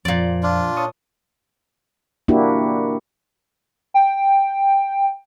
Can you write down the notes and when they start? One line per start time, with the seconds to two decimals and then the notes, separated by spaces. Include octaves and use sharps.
0.05 F2 A#2 F3 D5
0.43 D4 F4
0.77 C#5 A5 C#6 D#6
2.28 A#3 D4 E4 F#4 G4
3.94 G5